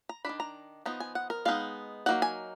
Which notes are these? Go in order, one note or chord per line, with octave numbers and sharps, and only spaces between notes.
A#5
D#3 F#3 D4 B5
A#5
F3 B3 D#4 A#5
G#5
F#5
A#4
G#3 B3 D#4 F5
F#3 A#3 D#4 F#5
G#5